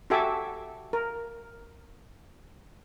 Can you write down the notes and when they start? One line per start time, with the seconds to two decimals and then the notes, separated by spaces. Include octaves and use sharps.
0.10 F#4 G4 A4 E5 G#5 D6
0.93 A#4